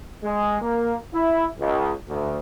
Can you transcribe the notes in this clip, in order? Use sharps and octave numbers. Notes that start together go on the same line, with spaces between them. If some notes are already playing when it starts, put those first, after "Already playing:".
G#3
A#3
E4
C#2
D2